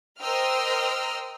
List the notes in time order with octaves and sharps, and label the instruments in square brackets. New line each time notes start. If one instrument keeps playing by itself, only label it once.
[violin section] A#4 C5 D#5 G5 E6 F6